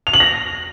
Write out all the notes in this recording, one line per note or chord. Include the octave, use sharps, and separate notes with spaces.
F7
F#7
A#6